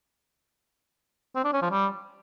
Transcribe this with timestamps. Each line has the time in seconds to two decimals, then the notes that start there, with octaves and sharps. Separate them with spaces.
1.35 C4
1.44 D4
1.53 C#4
1.62 F3
1.71 G3